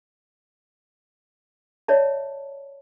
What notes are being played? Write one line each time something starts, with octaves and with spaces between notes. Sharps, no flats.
C#5 D5 E5 A5